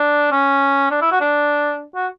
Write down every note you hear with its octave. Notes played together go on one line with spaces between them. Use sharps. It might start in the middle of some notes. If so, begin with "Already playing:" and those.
Already playing: D4
C#4
D4
E4
F#4
D4
F#4